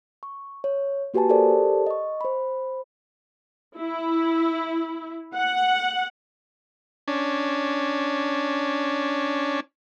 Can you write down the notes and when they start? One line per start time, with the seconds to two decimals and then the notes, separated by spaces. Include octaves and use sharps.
0.23 C#6
0.64 C#5
1.14 A#3 F#4 G4 B4 G#5 A5
1.29 G4 A4 A#4 C5 D5 A5
1.86 D#5 C#6
2.21 C5 B5
3.77 E4
5.35 F#5
7.08 C#4 D4